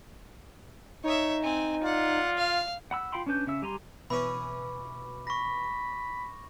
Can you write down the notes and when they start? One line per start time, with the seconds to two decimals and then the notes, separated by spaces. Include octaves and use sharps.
1.04 D#4 C#5 E5
1.43 C4 G#5
1.83 F4 D5 F#5
2.37 F5
2.91 F#5 B5 E6
3.12 F4 F5 G5 B5 C6
3.26 C#4 D4 B4 G6
3.47 C#3 C#4 E5 E6
3.62 G3 G4 G#5 A#5 C6
4.10 B2 E3 C#4 B5 D6
5.27 B5 C#6 A#6